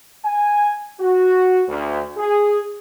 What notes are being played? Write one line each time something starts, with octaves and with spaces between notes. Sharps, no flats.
G#5
F#4
D2
G#4